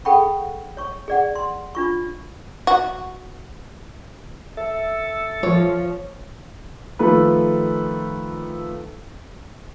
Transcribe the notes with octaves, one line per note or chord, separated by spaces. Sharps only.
G#4 A4 F#5 G5 B5 C#6
C#5 C#6
G#4 D5 F#5
C6
D4 F4 C#6
F#4
A4 E5
F3 C#5
D#3 F3 A3 A4 B4